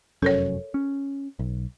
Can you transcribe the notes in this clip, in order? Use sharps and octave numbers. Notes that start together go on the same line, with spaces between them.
F1 F#2 C#4 A4 A#4 C#5
C#4
B1